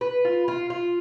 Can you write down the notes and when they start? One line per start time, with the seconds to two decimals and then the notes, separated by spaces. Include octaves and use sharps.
0.01 B4
0.25 F4
0.48 F4
0.70 F4